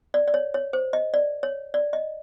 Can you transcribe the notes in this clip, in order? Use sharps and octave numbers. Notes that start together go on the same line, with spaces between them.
D5
D5
C#5
C#5
C5
D#5
D5
C#5
D5
D#5